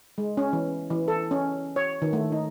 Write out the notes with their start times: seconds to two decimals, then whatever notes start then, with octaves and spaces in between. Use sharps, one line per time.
0.18 G#3
0.37 C#4
0.53 E3
0.90 E3
1.08 A4
1.31 C#4
1.76 C#5
2.02 D#3
2.13 A3
2.32 D#4